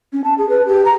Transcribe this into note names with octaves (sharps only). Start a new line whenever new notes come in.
C#4
A5
G#4
B4
G4
A#5